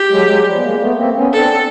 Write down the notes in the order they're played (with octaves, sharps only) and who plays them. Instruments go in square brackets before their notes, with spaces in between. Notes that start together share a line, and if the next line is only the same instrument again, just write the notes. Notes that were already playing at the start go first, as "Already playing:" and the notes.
Already playing: [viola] G4
[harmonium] F#3 G#3
F#3 G#3
F3 G3
B3
G#3 A#3
A3 B3
A#3 C4
B3 C#4
[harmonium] C4 D4 [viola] A4